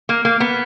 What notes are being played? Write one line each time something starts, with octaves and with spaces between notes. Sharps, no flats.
A#3
A#3
B3